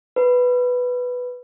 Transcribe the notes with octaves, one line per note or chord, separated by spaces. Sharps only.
B4